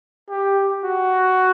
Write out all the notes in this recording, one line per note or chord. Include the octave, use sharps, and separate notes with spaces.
G4
F#4